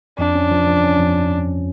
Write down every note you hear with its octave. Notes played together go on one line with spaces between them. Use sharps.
F2 D4
C#4
F3
F3
C#4
F2